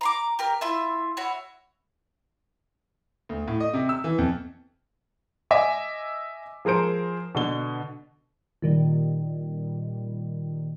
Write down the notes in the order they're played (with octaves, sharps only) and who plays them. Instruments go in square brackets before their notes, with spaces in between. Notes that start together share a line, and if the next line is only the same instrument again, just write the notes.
[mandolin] A#5 C6 D6
G4 A#4 F6
E4 F4 E5
E4 F#4 C#5
[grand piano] D2
A2
D#5
C3
E6
E3
F2
D#5 E5 G#5 D6 E6
F3 G#4 A#4 C5 D7
B2 D3 G7
[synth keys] A#2 D#3 G3